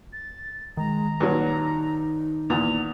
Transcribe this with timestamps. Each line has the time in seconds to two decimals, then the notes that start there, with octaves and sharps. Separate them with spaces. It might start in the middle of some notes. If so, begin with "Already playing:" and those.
0.13 A6
0.77 D#3 G#3 A#5
1.20 G2 A#2 F#3 D#4
2.50 E2 A#2 F7